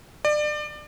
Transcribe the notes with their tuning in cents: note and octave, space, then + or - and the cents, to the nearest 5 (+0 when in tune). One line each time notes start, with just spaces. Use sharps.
D5 +30